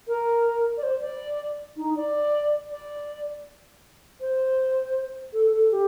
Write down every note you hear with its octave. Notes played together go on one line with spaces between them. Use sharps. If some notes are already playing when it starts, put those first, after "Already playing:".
A#4
D5
C5
D5
D#4
D5
D5
C5
A4
A4
G4